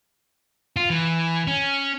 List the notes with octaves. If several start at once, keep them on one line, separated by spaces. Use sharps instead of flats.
F4
E3
C#4